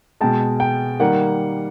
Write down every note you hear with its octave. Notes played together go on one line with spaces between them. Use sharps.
B2 G#3 G5 A5
G5
D#3 G3 A#3 F#5